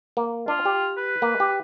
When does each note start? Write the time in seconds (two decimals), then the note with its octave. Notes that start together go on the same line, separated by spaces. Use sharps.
0.17 A#3
0.48 D4 F4
0.65 G4
0.97 B4
1.22 A#3
1.40 G4